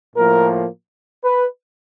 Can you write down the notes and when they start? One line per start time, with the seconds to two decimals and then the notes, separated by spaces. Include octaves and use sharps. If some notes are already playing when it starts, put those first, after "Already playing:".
0.16 A2 F3 A#3 A#4
1.24 B4